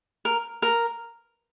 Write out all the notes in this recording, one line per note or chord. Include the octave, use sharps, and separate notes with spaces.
A#4
A#4